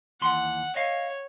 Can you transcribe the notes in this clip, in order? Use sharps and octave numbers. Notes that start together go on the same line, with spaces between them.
D#2 E3 F#5 C6
C#5 D#5 F5